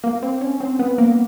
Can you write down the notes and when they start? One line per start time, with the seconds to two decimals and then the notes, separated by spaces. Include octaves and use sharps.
0.04 A#3
0.23 C4
0.41 C#4
0.60 C4
0.79 B3
0.98 A#3